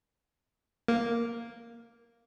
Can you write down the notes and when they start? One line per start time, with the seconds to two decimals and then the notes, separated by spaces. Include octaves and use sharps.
0.88 A#3